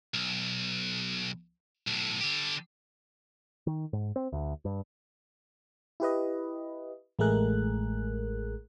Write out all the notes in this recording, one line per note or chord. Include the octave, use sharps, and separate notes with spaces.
B1
B1 A2
D3 G4
D#3
G#2
C4
D2
G2
E4 G4 B4 D#5
A1 G#3 A3 G#4 A#4 F#6